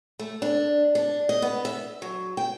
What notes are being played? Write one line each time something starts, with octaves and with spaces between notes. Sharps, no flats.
A3
D4
D4
D#5
B3
E5
F#3
G5